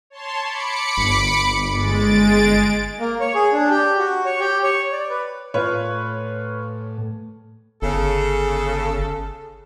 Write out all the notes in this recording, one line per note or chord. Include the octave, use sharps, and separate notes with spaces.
C#5 A5 C6
B5 D6 C#7
G1
G#3 A6 D7
A#3
C#5
G#4
D4
G4
F#4
C#5
G4
C#5
D5
B4
A2 F4 B4 C#5
G1 C#3 A4